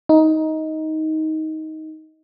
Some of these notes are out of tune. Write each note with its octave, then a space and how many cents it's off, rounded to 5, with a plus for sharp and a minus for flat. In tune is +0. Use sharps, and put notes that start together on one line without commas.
D#4 +15